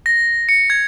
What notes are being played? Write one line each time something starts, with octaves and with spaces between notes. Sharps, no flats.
A#6
C#7
G#6